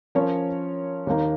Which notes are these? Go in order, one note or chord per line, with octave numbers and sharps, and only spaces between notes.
F3 C#4 A#4 C#5
D#2 D#3 A#3 D#4